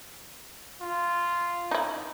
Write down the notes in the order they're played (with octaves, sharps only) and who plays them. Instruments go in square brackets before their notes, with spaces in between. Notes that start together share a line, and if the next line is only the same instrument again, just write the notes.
[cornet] F4
[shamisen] D#4 E4